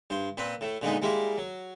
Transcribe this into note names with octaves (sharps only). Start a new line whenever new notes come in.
G2 C5
A#2 C4 B4
A2 A3
A#2 D3 G#3 B3 D#4
G3 G#3 A#3 E4
F#3